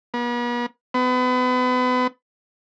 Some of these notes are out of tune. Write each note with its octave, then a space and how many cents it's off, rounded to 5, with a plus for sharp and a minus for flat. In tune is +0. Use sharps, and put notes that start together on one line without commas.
B3 -40
B3 +35